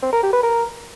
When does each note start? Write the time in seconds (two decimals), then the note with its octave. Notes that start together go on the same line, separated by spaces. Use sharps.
0.02 C4
0.13 A#4
0.23 G4
0.33 B4
0.43 A#4